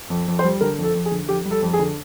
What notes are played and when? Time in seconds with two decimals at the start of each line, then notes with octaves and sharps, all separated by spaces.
0.10 F2
0.28 F2
0.39 C5
0.44 G3
0.61 D3 A#4
0.78 F2
0.84 A4
0.95 F2
1.06 G#4
1.12 D3
1.29 F2 G4
1.45 G3
1.51 A4
1.62 F2
1.73 G#4
1.79 D3